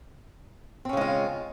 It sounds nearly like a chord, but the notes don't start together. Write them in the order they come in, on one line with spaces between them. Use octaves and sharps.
C4 C#4 C#3 G#3 F4